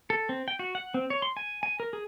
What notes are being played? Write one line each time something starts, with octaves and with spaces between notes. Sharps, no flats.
A4
C4
G5
F#4
F#5
C4
C#5
C6
G#5
G#5
A#4
G#4